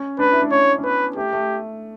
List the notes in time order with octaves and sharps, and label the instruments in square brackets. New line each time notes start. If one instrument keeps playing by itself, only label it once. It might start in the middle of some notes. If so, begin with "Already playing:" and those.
Already playing: [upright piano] C#4
[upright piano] D4 [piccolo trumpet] B4
[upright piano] E4
D4
[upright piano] C#4 [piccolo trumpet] C#5
[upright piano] C#4
[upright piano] B3 [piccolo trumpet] B4
[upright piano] A3 [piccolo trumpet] G4
[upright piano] A3